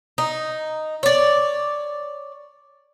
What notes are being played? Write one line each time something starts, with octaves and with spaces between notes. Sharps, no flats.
D#4
C#5 D5